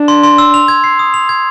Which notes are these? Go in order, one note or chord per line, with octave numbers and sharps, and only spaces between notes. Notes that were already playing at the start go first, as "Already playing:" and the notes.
Already playing: D4
C6
C6
E6
F7
G#6
C7
D#6
F7
G#6